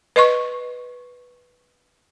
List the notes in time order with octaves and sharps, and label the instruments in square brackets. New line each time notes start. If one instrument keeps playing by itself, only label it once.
[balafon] B4 D#5 C6 C#6